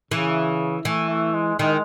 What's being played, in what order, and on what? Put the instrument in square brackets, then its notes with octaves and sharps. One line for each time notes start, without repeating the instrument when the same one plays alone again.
[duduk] C#3 [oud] E3
[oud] E3 [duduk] A3
[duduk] A3
G#3
[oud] D#3 [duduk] G#3